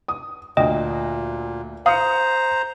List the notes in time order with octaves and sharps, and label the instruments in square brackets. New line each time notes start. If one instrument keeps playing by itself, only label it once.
[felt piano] D#6
[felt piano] D2 [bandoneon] A#2 [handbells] D#5 G5
[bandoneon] C5 A#5 [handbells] F5 [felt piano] D#6 C#7